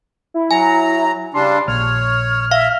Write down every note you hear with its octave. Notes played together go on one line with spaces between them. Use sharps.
E4
F#3 G#5 A#5
C#3 G3 D4 C6
A#1 C#5 F6
E5 F5